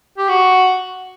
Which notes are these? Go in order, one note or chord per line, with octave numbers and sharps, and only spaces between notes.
G4
F#4